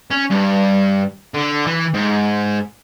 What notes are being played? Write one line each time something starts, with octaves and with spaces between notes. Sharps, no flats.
C#4
G2
D3
E3
G#2